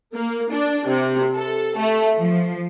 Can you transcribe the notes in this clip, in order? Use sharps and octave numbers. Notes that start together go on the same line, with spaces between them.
A#3
D4
C3
A4
A3
F3